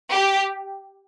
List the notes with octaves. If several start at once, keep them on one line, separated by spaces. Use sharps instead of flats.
G4